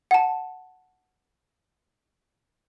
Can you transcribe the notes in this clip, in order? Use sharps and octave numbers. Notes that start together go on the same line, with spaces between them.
F#5 A5